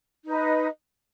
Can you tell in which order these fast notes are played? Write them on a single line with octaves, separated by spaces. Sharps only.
D#4 B4 D#5